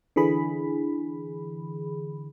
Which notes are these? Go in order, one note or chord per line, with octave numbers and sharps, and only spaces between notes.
D3 E3 G#4 B5